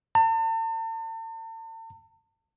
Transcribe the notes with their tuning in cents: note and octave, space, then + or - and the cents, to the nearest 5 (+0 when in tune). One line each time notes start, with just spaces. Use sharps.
A5 +40